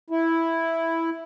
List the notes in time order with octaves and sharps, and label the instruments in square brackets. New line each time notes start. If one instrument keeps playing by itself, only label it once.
[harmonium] E4